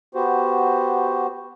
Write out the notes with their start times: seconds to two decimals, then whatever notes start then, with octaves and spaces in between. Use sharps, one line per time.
0.15 B3 F#4 G4 C5